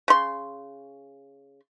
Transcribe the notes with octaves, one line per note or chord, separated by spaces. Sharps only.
C#3 C6